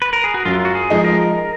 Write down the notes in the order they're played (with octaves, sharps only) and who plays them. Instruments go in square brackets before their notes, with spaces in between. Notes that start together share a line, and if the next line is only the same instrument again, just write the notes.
[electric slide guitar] B4
A#4
G#4
F#4
[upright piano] F#2 [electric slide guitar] F4
[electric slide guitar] F#4
G#4
[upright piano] F3 G#3 D#4
[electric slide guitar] A#4